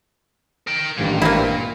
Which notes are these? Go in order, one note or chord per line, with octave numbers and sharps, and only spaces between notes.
A#4 G5
A1 G2 A#2 D#3
A#3 C4 E4